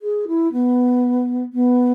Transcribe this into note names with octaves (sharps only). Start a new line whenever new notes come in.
G#4
E4
B3
B3